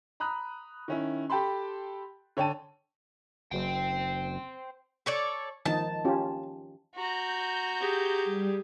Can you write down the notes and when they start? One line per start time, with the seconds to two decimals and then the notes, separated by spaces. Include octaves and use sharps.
0.20 A#5 B5 D#6 F#6
0.88 D#3 C#4 E4
1.30 G4 A4 G5 A5 B5 C6
2.37 D3 C#5 G5 A5 D#7
3.52 F#1 C5 G5
5.06 A4 C#5 D5
5.66 D#3 F3 D#4 A5
6.05 C#4 F4 G4
6.95 F#4 A#5 G6
7.80 G4 G#4
8.25 G3